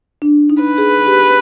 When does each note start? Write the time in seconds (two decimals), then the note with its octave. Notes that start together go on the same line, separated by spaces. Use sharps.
0.22 D4
0.50 D#4
0.63 B4
0.78 G#4
1.07 G4